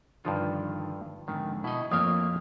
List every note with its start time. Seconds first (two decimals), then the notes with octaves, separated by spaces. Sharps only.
0.25 G2 D3 D#3 F3 F4
1.28 F2 G#2 D3 D#3
1.64 B2 E4 D#5
1.91 F2 A3 A#3 C#5 F5 G5 D#6 F6